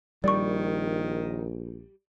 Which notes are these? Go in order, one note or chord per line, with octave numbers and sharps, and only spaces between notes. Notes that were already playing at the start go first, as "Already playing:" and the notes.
A#1 D#3 G3 D5 C#6